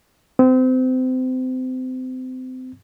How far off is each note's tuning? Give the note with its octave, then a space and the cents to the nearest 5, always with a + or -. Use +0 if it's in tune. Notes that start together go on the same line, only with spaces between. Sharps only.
C4 -30